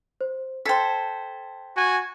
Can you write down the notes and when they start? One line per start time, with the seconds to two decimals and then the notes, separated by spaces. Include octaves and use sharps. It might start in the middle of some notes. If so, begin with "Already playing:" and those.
0.21 C5
0.66 A4 C5 G5 G#6 B6
1.77 F#4 G#5